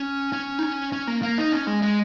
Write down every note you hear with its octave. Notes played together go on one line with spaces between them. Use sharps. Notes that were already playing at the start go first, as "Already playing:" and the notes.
Already playing: C#4
C#4
D#4
C#4
C#4
A#3
A#3
D#4
C#4
G#3
G#3